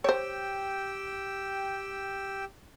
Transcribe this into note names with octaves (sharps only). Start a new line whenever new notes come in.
G4 C5 C#5 G5 E6